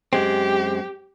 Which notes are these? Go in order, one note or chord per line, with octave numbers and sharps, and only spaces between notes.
F#2 G#3 C4 G4